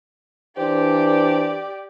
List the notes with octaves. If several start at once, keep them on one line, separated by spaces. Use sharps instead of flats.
E3 D4 G4 C5 D5